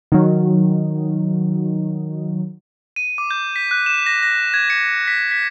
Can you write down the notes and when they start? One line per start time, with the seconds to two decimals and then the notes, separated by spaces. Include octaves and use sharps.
0.12 D#3 F#3
2.96 D#7
3.18 D6
3.31 G6
3.56 B6
3.71 F#6
3.86 E7
4.06 A#6
4.23 A#6
4.54 G#6
4.70 C#7
5.08 B6
5.31 B6